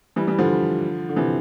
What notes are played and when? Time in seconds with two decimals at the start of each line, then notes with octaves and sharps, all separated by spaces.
0.16 E3 G3
0.27 E3 G3
0.38 D3 F3
1.09 D3
1.16 C3 E3